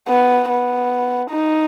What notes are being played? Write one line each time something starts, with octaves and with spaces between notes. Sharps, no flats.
B3
B3
D#4